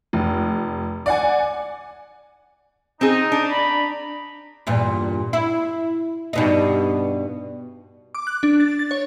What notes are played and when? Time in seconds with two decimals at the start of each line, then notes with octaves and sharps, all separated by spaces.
0.13 F1
1.06 D5 F#5 G#5
3.01 C4 D#4 G#4
3.32 D4
3.51 D5 A#5 B5
4.67 E2 G2 A#2
5.33 E4
6.33 G2 B2 D#4
8.15 D6
8.27 F#6
8.43 D4
8.60 A6
8.79 A6
8.91 C#5